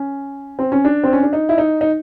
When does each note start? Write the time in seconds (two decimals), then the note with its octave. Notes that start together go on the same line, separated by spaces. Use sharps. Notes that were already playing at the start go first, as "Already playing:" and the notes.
Already playing: C#4
0.59 C4
0.72 C#4
0.85 D4
1.04 C4
1.13 C#4
1.23 D4
1.33 D#4
1.49 E4
1.58 D#4
1.81 D#4